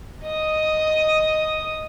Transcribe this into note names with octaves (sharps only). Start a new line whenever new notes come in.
D#5 D#6